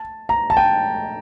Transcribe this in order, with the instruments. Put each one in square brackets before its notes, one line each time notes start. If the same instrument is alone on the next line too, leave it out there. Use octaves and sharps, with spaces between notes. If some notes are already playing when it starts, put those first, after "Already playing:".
Already playing: [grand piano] A5
A#5
A5
G5